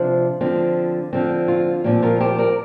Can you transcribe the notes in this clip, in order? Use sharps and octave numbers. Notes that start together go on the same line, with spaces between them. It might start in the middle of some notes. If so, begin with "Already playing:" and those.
Already playing: C3 F3 D4 C5 F5
D3 F3 C4
D3 F3 C4
F4
A#2 F3 C4 G4
F4 A#4
G4 C5
A#4 D5